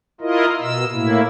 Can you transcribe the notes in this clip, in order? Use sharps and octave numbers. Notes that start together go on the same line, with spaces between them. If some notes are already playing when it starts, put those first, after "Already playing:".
E4 F4 A#4 D#5
B2 E6
A2 A#3 E4